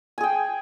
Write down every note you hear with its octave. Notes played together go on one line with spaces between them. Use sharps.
G#4 G5 G#5